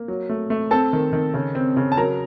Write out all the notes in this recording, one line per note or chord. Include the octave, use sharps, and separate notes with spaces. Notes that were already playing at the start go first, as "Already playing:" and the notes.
Already playing: A#3
F#3
A3
A3
C4 A4 A5
D#3
D#3
C#3
C4
C#3
A5
F#3 A#4 A#5